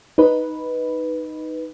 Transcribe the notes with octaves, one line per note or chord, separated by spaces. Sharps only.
D#4 B4